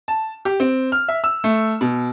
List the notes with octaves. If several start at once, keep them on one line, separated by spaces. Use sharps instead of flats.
A5
G4
C4
F6
E5
E6
A3
B2